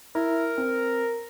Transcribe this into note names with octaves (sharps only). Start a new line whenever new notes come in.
E4 A#4
C4